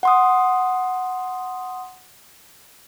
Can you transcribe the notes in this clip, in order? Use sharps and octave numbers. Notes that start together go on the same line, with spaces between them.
F#5 C6 D#6